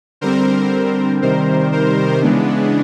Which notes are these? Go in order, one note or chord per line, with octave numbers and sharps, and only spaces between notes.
D3 G3 C4 A#4 C5
C3 D#3 G3 A#4 C5
A#4 C5
C#3 E3 G#3 B3 D4